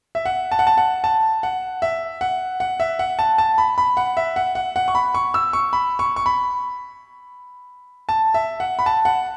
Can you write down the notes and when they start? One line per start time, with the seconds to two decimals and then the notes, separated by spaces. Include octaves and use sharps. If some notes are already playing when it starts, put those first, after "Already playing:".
0.15 E5
0.26 F#5
0.52 A5
0.59 F#5
0.67 A5
0.78 F#5
1.04 A5
1.43 F#5
1.82 E5
2.21 F#5
2.60 F#5
2.80 E5
2.99 F#5
3.19 A5
3.38 A5
3.58 B5
3.78 B5
3.97 F#5
4.17 E5
4.36 F#5
4.55 F#5
4.76 F#5
4.88 C#6
4.95 B5
5.14 C#6
5.34 E6
5.53 C#6
5.73 B5
5.99 C#6
6.16 C#6
6.26 B5
8.09 A5
8.34 E5
8.60 F#5
8.79 B5
8.86 A5
9.05 F#5